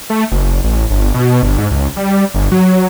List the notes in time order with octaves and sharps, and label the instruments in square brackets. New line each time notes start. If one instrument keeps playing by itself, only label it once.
[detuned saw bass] A3
F#1
A1
G1
B2
G1
G#2
C#2
G3
G1
F#3